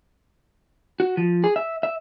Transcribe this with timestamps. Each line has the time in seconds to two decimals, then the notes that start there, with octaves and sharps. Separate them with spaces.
1.00 F#4
1.17 F3
1.44 G#4
1.56 E5
1.83 E5